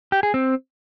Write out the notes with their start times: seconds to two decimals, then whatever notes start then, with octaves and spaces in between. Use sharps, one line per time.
0.12 G4
0.23 G#4
0.34 C4